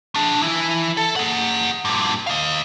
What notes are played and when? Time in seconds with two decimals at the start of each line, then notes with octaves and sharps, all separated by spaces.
0.15 D4 G#4
0.42 E3 E4
0.97 A4
1.16 G#4 F#5
1.85 G2 A#2
2.27 D#5 F5